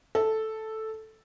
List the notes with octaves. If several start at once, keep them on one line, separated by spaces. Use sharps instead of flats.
A4